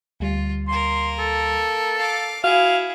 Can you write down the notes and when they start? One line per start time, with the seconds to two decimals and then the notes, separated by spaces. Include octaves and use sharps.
0.20 D2 G3 F4
0.68 A#3 A#4 C6
1.19 A4
1.98 F5 D6
2.44 E4 F#4 G#4 F5